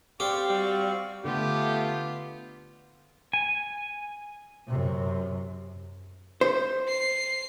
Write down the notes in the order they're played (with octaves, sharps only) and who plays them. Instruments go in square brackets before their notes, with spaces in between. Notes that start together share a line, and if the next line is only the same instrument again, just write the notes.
[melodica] C4 F5 C#6 [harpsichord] G4 [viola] D5
[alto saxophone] G3 [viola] F#4 D5
[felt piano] D3 [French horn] A3 [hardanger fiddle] B3 F4 [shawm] G4
[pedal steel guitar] G#5
[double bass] F#2 C3
[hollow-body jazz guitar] C5
[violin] C7